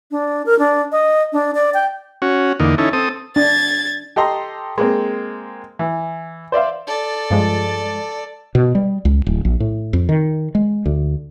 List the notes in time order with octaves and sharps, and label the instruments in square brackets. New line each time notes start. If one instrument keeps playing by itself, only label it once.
[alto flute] D4
A#4
D4
D#5
D4
D5
G5
[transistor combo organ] C#4 F#4
E2 D3 A#3 D#4
C#4 D#4 E4 A4
C4 A4 D#6
[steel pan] D4 [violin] G#6 A6
[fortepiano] G4 A4 D#5 A#5 C6
G#3 A#3 C4
E3
C5 D5 E5 F5
[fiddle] A4 D5
[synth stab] G2 F3 G#3
[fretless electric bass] B2
G3
C#2
D1
A#1
A2
F2
D#3
G#3
D2